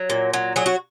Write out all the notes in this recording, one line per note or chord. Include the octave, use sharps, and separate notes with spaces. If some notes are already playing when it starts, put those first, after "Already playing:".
Already playing: F#3
A#2
F#3
F#3 G#4
F#4